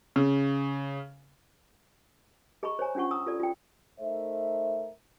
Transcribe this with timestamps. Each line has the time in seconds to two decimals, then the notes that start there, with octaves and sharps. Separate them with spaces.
0.16 C#3
2.63 G#4 D#5 A#5 B5 C#6
2.79 C5 C#5 G#5 A#5
2.95 C#4 D4 F4 F#5 C#6
3.11 A#5 D#6 E6
3.26 F4 A4 D5
3.39 F4 G5
3.99 A3 D#4 A#4 C5 E5